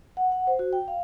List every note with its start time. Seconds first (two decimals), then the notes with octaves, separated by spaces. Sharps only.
0.17 F#5
0.32 F#5
0.47 C5
0.59 F#4
0.73 G5
0.88 F5